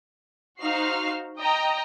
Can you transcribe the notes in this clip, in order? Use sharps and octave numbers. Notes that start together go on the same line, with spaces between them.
D#4 F#4 C5 F5 F6 C7
D#5 G5 A#5